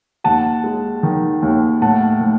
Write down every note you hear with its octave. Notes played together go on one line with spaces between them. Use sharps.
D#2 F#5 A5
G#3
D#3
D#2
A2 F#5 A5
A2